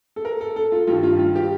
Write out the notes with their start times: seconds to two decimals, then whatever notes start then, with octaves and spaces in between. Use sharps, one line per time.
0.16 A4
0.25 A#4
0.41 A4
0.56 A4
0.72 F4
0.87 G2 D#3 G3 F4
1.03 F4
1.19 F4
1.35 G4